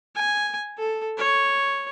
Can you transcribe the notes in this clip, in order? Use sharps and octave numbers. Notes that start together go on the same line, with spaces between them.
G#5
A4
C#5